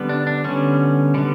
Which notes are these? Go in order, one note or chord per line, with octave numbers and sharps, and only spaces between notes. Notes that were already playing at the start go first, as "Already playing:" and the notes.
Already playing: D3 G3 B3
D4
D4
D3 G3 B3 C#4
D3 G3 B3